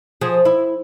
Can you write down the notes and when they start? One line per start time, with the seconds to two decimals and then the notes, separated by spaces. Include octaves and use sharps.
0.21 F3 G#4
0.45 E4